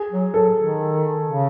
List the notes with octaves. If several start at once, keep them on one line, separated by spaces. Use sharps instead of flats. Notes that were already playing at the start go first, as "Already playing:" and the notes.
Already playing: G#4
F#3
F#3 A4
D#3
C#3